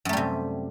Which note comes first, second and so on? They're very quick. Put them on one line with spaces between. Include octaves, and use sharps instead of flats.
F#2 A3 G3 C3